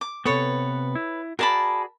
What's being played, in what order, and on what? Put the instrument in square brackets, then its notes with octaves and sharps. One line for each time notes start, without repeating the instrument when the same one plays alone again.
[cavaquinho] D6
[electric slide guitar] C3 B3 [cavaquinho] A4 B4 C#5
[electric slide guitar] E4
[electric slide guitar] F#4 G#4 D5 [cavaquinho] A#4 A5 B5